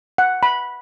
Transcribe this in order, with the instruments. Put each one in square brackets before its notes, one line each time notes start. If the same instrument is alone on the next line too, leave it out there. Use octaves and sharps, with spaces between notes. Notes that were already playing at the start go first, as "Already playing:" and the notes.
[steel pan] F#5
B5